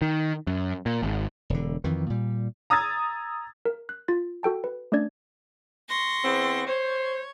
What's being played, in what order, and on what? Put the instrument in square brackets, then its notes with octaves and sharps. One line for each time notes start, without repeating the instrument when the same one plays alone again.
[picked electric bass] D#3
F#2
A#2
G#1
[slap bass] E1 D3
F2 D#3 E3
A#2 G3
[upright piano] A#5 D#6 E6 G#6 A6
[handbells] A#4
F#6
F4 A6
F#4 A4 G5 A5
B4
A3 C#4 D4 D5 G#6
[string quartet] C6 C#6 A#6
[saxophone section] E2 B3 C4
[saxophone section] C5 [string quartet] C#5